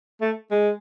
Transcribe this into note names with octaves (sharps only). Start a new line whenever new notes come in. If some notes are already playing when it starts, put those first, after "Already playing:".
A3
G#3